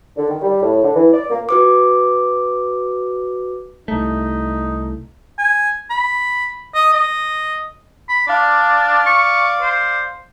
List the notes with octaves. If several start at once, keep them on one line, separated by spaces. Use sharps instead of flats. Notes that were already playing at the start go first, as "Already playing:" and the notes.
D3
D#3
G3
A2
D3
E3
D5
A#3
F#4 B4 D6
C2 A3 D#4
G#5
B5
D#5
D#5
B5
D4 D5 F5
C#6
C5